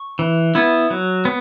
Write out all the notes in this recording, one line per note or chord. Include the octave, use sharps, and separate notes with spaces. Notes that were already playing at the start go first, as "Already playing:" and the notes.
Already playing: C#6
E3
B3 E4
F#3
B3